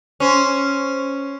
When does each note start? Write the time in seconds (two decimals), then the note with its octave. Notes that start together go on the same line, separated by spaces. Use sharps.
0.20 C#4 C5